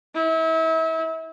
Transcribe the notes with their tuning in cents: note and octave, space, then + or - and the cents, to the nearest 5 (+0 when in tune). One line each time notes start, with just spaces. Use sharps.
E4 -35